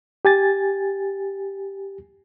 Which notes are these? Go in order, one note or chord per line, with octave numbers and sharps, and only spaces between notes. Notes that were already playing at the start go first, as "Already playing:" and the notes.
G4 G#5 A6